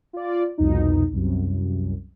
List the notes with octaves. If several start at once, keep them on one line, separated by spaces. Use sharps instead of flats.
F4 D5
C2 F2 B2 D#4
C2 F#2